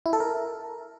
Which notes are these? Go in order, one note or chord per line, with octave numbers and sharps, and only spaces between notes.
E4
A4
A#4